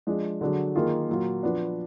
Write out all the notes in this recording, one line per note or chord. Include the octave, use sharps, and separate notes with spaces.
F3 G#3 D4 F4 G#4
D3 F#3 D4 G#4
D#3 A#3 F4 G#4
A#2 F#3 A#3 F4
F3 B3 D4